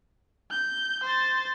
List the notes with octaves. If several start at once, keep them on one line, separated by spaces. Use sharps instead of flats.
G6
C5 A6